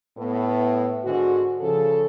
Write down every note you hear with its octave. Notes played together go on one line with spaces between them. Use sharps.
A2 B3
G#2 D3 F#4
C#3 F3 A4